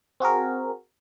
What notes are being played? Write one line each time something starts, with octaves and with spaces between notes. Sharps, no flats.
C4 F#4 G#4 A#4